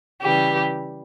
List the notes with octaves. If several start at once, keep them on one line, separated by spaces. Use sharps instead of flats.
C#3 E3 G3 G4